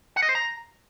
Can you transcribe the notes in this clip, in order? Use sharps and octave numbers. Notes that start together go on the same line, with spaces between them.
F#5
D#5
C5
A#5